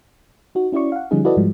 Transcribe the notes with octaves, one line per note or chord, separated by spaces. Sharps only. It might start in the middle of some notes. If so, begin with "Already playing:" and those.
D#4 F#4
C#4 E4 F#4 D5 C#6
F5 F#5
D3 F3 G3 C#4 D#4 G#4
E4 F#4 A4 B4 D5 D#5
G#2 F3 G3 G#3